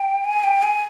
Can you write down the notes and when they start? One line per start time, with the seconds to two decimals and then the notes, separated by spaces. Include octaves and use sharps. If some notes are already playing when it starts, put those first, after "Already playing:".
Already playing: G5
0.25 G#5
0.44 G5
0.63 G#5